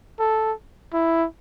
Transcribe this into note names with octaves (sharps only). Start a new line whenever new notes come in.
A4
E4